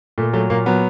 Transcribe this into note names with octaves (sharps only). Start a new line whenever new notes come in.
A#2 A3
F#3 A3
A#2 A#3
F#3 B3